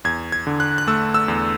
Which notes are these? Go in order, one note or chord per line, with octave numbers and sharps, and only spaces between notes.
E2 G#6
G#6
D3
F#6
F#6
A3 E6
E6
E2